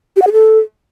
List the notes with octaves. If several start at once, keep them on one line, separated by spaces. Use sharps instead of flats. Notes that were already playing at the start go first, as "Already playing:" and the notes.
G4
F#5
G#4
A4